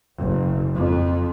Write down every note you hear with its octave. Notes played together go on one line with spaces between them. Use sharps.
F#1
F2